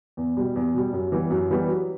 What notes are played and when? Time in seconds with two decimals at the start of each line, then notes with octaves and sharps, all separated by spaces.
0.17 E2
0.37 B2 G3
0.56 E2
0.75 B2 G3
0.93 F#2
1.12 E3 G3 B3
1.30 F#2
1.50 E3 G3 B3
1.69 F#3